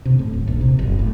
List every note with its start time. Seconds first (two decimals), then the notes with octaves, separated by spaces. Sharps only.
0.05 C3
0.19 A2
0.33 D#1
0.47 A#1
0.61 C3
0.79 F#1
0.99 A2